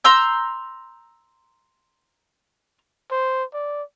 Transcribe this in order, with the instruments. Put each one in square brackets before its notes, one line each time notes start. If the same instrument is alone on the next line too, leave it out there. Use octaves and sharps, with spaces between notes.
[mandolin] A#5 C6 E6 G6
[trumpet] C5
D5